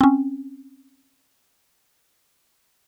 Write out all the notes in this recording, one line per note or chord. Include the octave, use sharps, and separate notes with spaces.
C4 C#4